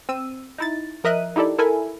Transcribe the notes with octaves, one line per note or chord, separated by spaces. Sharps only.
C4 E6 D#7
D#4 E4 A6
F3 A#4 D#5 E5 F#6 D#7
D#4 E4 G4 A4 D5
E4 A4 A#4 E5 G#5 B5